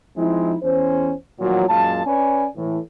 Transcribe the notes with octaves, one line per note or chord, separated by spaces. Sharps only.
F3 G#3 C4 D#4 E4
E2 C#4 C5
A1 A#2 D#3 F3 F#3
F#2 A#2 G#3 F5 A5
C#4 B4 C#5 D5 G#5
A2 E3